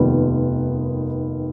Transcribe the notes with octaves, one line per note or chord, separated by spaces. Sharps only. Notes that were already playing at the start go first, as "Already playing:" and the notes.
Already playing: F1 D#2 D#3 G3 B3